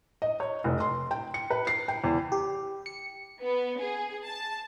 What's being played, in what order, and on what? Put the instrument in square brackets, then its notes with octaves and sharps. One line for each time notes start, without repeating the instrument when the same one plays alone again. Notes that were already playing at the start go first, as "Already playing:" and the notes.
[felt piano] D#5
C#5
F1
C6
G5
C#7
B4
C7
G5
E2
[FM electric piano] G4
C#7
[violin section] B3
G#4
A5